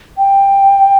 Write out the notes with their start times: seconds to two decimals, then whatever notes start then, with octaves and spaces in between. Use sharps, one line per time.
0.18 G5